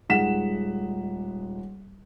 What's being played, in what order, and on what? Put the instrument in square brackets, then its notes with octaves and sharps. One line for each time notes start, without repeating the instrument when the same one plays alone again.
[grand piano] D#1 G#3 D#4 F#5 B6 E7